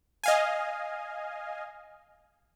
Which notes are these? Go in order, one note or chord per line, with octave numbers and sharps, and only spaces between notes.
D#5 F5 G#5